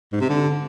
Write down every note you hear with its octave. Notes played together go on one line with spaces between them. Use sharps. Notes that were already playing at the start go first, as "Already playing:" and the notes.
G#2
C3
D3